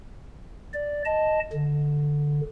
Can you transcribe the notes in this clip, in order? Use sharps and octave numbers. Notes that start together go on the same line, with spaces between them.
D5
D#5 A5
D3